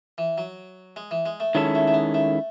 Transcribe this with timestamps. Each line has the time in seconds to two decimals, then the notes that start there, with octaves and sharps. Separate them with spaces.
0.18 E3
0.38 F#3
0.96 G#3
1.11 E3
1.26 G#3
1.40 A3
1.55 D#3 F#3 G#3 C#4 E4 A4
1.75 A3
1.88 A3
1.94 B3
2.14 A3